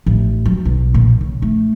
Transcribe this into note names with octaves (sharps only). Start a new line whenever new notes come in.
A1
F#3
B1
A#2
C#3
A3